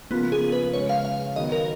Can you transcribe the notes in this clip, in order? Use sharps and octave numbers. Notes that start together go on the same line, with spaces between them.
C#3 F3 A#3 B3 F4
G#4
B4
C#3 G#3 C#4 C#5
F5
F5
D#3 F#3 B3 D#5
A#4